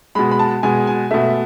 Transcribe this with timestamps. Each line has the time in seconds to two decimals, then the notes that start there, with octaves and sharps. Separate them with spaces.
0.15 B2 G#3 B5
0.31 B5
0.39 A5
0.63 B2 G#3 G#5
0.87 G#5
1.11 B2 A3 E5